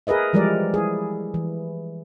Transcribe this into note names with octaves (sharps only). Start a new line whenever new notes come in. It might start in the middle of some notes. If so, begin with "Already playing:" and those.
G#4 A#4 B4 D#5 E5
E3 F3 G3 G#3 A#4 D5
E4 G#4
E3